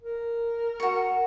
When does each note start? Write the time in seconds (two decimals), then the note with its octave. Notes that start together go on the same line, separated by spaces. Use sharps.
0.02 A#4
0.80 F#4 C#6